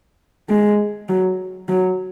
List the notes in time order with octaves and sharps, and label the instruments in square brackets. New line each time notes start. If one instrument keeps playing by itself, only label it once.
[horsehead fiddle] G#3
F#3
F#3